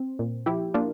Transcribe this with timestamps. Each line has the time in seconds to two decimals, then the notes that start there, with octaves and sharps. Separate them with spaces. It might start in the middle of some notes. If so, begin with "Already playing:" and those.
Already playing: C4
0.19 A#2
0.46 F3 E4 G4
0.74 A#3 D4 F4